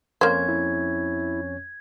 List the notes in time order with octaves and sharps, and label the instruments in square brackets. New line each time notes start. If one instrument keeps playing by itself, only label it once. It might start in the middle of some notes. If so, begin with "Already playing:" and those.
[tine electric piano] F2 C#4 C#5 [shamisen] A#3 C5 [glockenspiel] G#6
[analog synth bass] E4